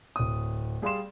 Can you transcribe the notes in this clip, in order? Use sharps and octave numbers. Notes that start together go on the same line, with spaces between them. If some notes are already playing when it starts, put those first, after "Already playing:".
D1 D#6
G3 G#4 D5 F5 C6 E7